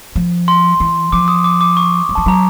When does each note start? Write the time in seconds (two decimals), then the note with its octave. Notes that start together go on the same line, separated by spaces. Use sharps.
0.16 F3
0.48 C6
0.80 E3
1.12 F3 D6
1.28 D#6
1.44 D6
1.61 D6
1.77 C#6
2.09 F#3
2.15 F3 A5
2.26 F#3 A#5